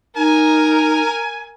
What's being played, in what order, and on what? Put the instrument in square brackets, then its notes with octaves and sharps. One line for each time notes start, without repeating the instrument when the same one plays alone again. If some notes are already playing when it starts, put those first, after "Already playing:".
[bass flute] D#4 [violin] A#4 [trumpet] G#5